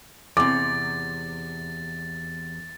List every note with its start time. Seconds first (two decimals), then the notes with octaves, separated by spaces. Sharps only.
0.37 E2 C3 D6 A6